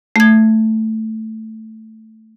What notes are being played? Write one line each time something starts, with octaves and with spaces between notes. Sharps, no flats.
A3 G#6